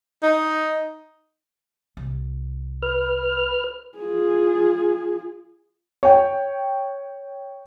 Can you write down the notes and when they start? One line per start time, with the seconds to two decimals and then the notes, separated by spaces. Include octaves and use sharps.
0.23 D#4
1.97 C2
2.82 B4 F6
3.98 F4 G#4
6.03 C#5 G5